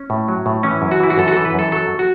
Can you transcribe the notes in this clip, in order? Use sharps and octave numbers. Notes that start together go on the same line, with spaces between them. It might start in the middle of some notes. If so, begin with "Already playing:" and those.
Already playing: C#4
A2
F#3
A2
E3 C#4
F#2
F#4
E3 E4
F#4
F#2 A4
F#4
E3 A4
B4
F#2 A4
F#3 A4
F#4